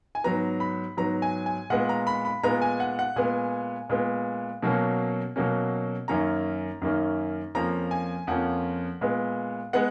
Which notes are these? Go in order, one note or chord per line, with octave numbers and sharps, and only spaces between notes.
G#5
G#2 F#3 B3 A#5
B5
G#2 F#3 B3 A#5
G#5
G#5
A#2 G#3 B3 F#5
A#5
B5
B5
A#2 G#3 B3 A#5
G#5
F#5
F#5
A#2 G#3 B3 G#5
A#2 G#3 B3
B2 F#3 A#3 C#4
B2 F#3 A#3 C#4
F#2 D#3 A#3 C#4 A#5
F#2 D#3 A#3 C#4
F2 F3 A#3 C#4 A#5
G#5
F2 F3 A#3 C#4 F#5
A#2 G#3 B3
G#3 B3 F#5